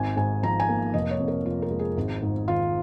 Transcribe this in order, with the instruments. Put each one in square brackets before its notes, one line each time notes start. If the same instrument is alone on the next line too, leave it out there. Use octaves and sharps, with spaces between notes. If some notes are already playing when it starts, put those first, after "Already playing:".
Already playing: [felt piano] G#1 G#5
G#2 G#5
F3 A#5
G#5
A#3
F1 D#5
C#5
F2
A#4
F3 F4
A#4
G#3
G#4
G#1
G#2
D#3 F4